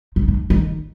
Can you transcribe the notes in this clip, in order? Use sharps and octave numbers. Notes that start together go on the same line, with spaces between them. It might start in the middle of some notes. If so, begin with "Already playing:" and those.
F3
D#3
D#3